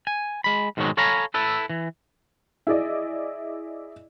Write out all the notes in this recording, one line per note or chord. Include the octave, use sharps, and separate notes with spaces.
G#5
G#3 B5
G#2 B2 D#3 E3 F#3 G#3
A4 C#5 F5 G#5 A#5 B5
E4 A4 B4
E3
E4 G#4 D5 D#5